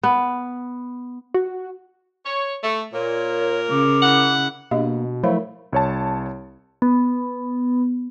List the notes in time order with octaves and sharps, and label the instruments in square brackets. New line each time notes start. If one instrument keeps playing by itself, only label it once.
[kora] B3
[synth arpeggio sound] F#4
[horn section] C#5
A3
[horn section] A#2 [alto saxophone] A#4 [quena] C#5
[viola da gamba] C#3 [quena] D6
[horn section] E4 F#5
[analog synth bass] B2 [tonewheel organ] A#3 [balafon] D4 G4 D#5
[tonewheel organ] F3 F#3 E4 [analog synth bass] A3 [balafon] A#4 F5
[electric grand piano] C2 C#5 A5
[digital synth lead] B3